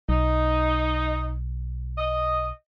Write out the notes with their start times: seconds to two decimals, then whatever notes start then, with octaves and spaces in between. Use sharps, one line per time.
0.09 B1 D#4
1.97 D#5